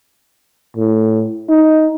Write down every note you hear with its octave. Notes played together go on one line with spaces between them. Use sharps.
A2
D#4